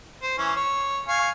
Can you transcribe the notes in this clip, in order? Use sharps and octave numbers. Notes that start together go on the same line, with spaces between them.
C5
E3 C#4
C#5
F5 G#5 C#6